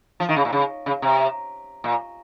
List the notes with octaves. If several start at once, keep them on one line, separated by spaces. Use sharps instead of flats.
F3
D#3
C#3
A#2
C#3
C#3
C3
A#2